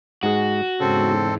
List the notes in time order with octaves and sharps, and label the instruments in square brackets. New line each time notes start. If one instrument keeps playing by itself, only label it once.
[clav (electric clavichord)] G#2 G#3 G#4 [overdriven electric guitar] F#4
[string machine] E2 G#2 [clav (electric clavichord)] C#3 [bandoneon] C4 A4